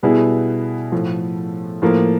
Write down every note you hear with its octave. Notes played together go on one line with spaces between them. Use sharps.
B2 G3 B3 E4 G#4
A2 F3 A3
A2 F3 A#3